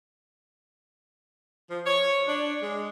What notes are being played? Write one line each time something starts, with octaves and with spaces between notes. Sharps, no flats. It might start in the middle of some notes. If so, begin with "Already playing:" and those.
F3
C#5
D4
G#3